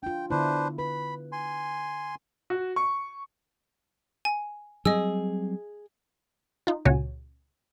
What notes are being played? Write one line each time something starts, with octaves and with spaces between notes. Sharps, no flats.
D4 F4 G5
D3 B3 D4 E4 B4 C5
B4 B5
G#5 C6
F#4
C#6
G#5
F#3 G3 C4 G#4 D#5 E6
D#4 F4
C#2 A#2 C#3 F#4 C#5 G#5